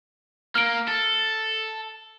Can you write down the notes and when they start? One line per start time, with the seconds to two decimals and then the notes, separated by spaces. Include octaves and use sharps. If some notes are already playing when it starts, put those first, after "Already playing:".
0.55 A#3 F6 D7
0.88 A4